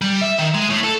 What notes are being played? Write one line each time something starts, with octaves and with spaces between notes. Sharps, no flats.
G3
E5
D#3
G#3
A2
A4